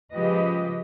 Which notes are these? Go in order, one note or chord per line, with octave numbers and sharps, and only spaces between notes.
C#3 F3 G#3 G4 B4 D#5